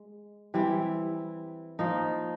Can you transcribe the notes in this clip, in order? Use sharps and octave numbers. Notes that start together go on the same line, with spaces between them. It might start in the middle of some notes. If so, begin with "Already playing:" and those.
Already playing: G#3
E3 G3 C4 E4
F3 A#3 D#4